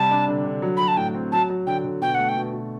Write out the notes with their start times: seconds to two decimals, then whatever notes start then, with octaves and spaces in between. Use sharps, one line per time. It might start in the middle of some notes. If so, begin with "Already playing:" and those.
Already playing: C3 G3 A5
0.11 D4
0.28 D3
0.45 D3
0.62 F#3
0.77 F#3 B5
0.88 A5
0.97 A2 G5
1.15 C4
1.32 F#3 A5
1.50 F#3
1.67 D3 G5
1.84 D3
2.02 B2 G5
2.14 A3 F#5
2.29 G5
2.36 B2
2.53 B2